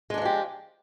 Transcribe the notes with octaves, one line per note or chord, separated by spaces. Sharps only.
F3 F#3 G#3 D4 G4